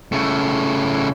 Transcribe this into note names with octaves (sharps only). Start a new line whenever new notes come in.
C#3 A3